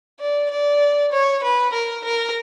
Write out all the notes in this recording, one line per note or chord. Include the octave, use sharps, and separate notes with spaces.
D5
D5
C#5
B4
A#4
A#4